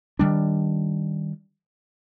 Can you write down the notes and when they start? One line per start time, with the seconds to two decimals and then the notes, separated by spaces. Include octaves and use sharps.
0.19 D#3 G3 D4